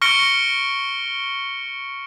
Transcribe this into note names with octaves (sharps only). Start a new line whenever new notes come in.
C#6 F6 A#6 C#7 D7 G7